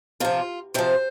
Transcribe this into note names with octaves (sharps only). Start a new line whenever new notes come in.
C3 F3 F4
C3 F3 C5